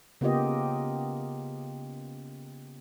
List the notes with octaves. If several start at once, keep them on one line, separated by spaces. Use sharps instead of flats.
C#3 A#3 B3 F4 G4 D#5